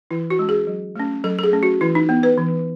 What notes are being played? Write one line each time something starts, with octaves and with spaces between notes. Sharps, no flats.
E3 E4
F#4
G#3 C#4
G#4
F#3
A3 C#4
F#3 A4
A4
G#4
A3 C#4
F#4
E3 E4
D#4
B3
B4
E3